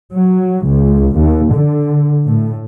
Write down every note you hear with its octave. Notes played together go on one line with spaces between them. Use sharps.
F#3
C#2
D#2
D3
A2